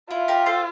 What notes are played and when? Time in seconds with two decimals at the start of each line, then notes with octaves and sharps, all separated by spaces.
0.10 E4 F4
0.28 G4 A#4
0.46 A4 C5